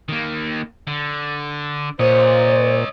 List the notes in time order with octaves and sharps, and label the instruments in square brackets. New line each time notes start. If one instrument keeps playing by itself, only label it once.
[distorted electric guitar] D#3 A#3
D3
[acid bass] A#2 [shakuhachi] C5 [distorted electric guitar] C#5 D#5